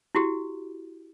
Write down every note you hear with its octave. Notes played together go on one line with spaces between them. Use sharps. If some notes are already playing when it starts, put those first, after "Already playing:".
E4 F#4 G4